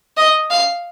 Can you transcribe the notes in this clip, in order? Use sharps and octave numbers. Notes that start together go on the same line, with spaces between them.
D#5
F5